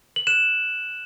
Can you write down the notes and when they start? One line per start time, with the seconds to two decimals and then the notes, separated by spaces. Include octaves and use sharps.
0.16 F#7
0.27 F#6 E7